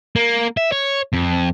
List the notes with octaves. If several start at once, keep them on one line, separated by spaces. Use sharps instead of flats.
A#3
E5
C#5
F2